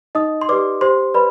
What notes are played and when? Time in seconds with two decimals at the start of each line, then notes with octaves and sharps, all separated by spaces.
0.15 D#4 D#5 D#6
0.41 C6
0.49 G4 B4 D5 D6
0.81 G4 C5 C6
1.14 B4 D5 B5